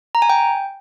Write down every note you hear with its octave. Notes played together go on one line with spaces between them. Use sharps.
A#5
G#5
G5